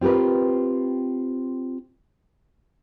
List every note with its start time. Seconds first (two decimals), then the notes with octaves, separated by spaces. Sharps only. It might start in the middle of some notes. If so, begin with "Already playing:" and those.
0.01 C4 F4 G4 A#4 B4